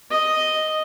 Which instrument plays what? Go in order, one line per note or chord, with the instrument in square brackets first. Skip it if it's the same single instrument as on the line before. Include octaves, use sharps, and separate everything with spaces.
[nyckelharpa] D#5